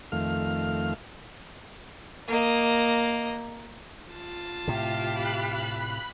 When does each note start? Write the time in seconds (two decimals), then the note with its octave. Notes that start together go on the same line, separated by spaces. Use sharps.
0.12 F2 D#3 A3 F5 F6
2.28 A#3 D#5
4.10 F4 A5
4.68 A2 C3 G4 F5
5.14 B5 F#6